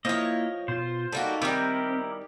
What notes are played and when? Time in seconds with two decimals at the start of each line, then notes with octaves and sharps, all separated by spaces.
0.05 F3 A#3 E4 A#4 C#5 D#5
0.68 B2 F4 C5
1.12 G3 A#3 D#4 F#4 A4
1.42 D#3 G3 C4 E4 G4 A#4